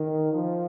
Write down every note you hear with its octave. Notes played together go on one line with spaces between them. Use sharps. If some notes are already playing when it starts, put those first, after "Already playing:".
Already playing: D#3
F3